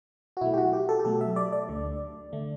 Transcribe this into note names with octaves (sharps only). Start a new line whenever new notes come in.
F#4
B2 F#3 A3 E4
G4
F#4
G4
A4
G4
B2 F#3 A3 A4
E5
D5
D5
D2 D3 A3
D3 A3